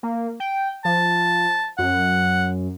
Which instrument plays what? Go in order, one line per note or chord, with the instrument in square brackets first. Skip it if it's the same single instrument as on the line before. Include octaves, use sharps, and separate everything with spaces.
[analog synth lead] A#3
G5
[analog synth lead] F3 [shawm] A5
[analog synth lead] F#2 [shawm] F#5